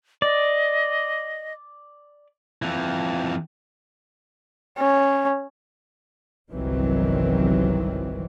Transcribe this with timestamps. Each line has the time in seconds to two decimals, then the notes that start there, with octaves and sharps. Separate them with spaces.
0.22 D5 D#5
2.62 F2 E3
4.78 C#4
6.51 G1 C2 D#3 E3 F#3 C4